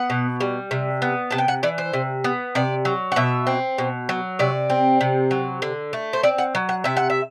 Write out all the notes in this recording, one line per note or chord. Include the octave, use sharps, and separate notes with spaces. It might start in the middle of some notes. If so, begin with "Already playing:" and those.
Already playing: B3 F#5
B2
G3
C3
B3
C3 A5
G5
F#5
E3 D5
C5
C3
B3
C3 D5
F#3
F#5
B2 E5
C4
B2
F#3
C3 D5
C4
C3
F#3
D3
A3
C5
C4 D5
F#5
F#3
F#5
C3 E5
F#5
E5